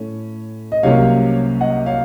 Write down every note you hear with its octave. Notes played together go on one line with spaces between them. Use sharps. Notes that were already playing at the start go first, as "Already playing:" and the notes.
Already playing: A2 A3 C#4
D#5
C2 C3 F#3 A#3 C#4 C#5 F5
D#5 F#5
C#5 F5